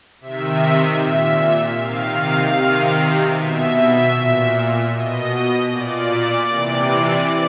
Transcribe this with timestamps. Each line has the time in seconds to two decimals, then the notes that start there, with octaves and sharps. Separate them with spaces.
0.21 C3 D#3 E5
0.99 A#2 E5
1.77 C3 D#3 F5
2.56 C3 D#3
3.35 B2 E5
4.13 A#2
4.92 B2 D#5
5.70 A#2 D5
6.49 C3 E3